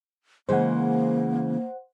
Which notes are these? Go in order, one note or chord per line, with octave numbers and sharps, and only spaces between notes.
C#3 E3 G#3 A#3 C5 F#5